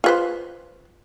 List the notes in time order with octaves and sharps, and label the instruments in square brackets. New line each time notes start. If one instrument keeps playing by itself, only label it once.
[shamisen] F4 B4 C5